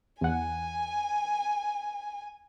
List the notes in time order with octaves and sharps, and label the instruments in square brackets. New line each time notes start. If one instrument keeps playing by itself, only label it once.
[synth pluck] E2 F#5 [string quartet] G#5